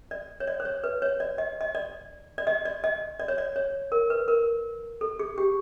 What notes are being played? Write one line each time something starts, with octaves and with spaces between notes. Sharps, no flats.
D5
C#5
D5
C5
C#5
B4
C#5
D5
D#5
D#5
D5
D5
D#5
D5
D#5
D5
C#5
D5
C#5
A#4
B4
A#4
A4
G#4
G4